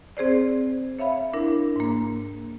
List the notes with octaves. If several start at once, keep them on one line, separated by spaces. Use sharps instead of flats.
C4 G#4 C5 D5
C#5 E5 F5 B5
D4 E4 A#4
G#2 A#3